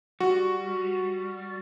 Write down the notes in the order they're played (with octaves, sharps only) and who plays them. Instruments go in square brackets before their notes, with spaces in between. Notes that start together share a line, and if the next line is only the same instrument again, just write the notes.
[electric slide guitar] G3 [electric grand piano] F#4